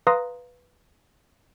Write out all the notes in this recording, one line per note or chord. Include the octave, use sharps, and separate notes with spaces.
B4 F5 A#5 C6 D#6 A#6